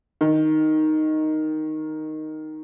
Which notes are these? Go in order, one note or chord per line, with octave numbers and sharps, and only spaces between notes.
D#3